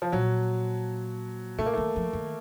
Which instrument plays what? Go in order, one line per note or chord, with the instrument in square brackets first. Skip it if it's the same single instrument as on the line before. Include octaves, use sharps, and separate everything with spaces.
[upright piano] F3
[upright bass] A#2 [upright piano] F#3
[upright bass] C3 [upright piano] A3
[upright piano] A#3
[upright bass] D#3 [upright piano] A3
[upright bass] F3
D#3